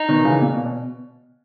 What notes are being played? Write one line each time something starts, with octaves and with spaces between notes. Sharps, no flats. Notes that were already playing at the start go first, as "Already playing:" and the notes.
Already playing: D#4
B2 D#3
C#3 E3
A#2
B2
B2